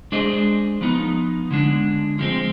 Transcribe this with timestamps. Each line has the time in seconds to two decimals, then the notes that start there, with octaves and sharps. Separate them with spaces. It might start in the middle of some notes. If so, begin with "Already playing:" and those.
0.12 G#3 D4 G#4 C5 D#5
0.81 F3 B3 D#4
1.51 D3 G#3 D4
2.19 F3 G#3 C4